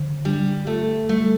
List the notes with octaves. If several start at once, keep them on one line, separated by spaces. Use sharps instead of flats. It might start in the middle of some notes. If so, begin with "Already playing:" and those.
Already playing: D3
G3 D4
A3 F4
G3 A3